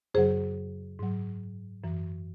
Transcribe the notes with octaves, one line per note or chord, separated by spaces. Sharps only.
F#2 C#3 F#3 G#4 C5
G#2 F#3
F#2 E3